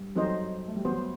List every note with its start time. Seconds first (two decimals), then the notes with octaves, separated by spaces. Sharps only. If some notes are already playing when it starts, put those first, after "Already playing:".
Already playing: G2 G3
0.16 F#2 F#3 C4 D#4 A4 C5 D#5
0.67 A3
0.76 G3
0.85 F#2 F#3 B3 F#4 C5